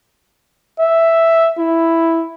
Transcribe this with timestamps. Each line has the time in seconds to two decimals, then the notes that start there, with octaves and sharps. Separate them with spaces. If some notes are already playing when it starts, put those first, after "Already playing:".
0.79 E5
1.58 E4